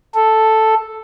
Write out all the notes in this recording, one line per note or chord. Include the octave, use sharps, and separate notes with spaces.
A4